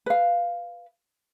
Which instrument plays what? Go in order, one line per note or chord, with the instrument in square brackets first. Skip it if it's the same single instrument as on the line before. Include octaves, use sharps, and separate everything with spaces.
[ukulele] B4 F5